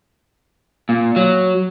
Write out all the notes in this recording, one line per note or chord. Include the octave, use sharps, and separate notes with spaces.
A#2
F#3